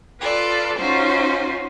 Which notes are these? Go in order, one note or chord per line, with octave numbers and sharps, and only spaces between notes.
F4 A4 B4 D5
C#4 D#4 F4 F#4 C5